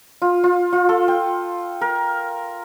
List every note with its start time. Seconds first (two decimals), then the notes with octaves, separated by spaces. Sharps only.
0.22 F4
0.44 F4
0.73 F4
0.89 A4
1.08 G5
1.81 A#4